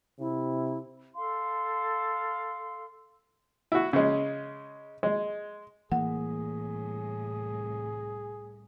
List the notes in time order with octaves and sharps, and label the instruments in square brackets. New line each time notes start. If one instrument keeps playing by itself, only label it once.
[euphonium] C3 [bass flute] E4
[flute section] A4 F5 C6
[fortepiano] E4 F#4
C#3 G#3
G#3
[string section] C2 A2 [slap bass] E3 A#3 [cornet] G#4 [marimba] F#5